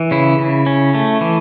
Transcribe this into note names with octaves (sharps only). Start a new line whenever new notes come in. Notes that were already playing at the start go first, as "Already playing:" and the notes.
Already playing: E3
C#3 E4
C#3
C#4
A3
E3